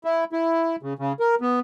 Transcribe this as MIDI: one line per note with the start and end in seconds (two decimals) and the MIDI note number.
0.05 0.24 64
0.32 0.76 64
0.83 0.93 49
0.99 1.13 49
1.20 1.35 70
1.41 1.60 59